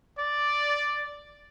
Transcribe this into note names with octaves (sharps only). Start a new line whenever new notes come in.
D5